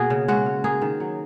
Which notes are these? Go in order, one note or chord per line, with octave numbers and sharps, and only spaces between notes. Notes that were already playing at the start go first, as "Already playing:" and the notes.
Already playing: B2 A#3 F#4 G#4
C#3
G#3 F#4
C#4
A#3 G#4
D#3
F#3